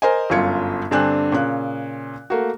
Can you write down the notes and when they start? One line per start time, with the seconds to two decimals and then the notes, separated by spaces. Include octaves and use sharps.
0.02 A#4 C5 D#5 G#5
0.30 G1 F#2 F4 G#6 C#7
0.91 G2 D3 C4 D4 G#5 F#6
1.32 A#2 C#3 F#6
2.30 A3 A#3 F#4